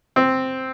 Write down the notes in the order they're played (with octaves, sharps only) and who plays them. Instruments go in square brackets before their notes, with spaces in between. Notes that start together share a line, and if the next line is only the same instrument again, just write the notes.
[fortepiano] C4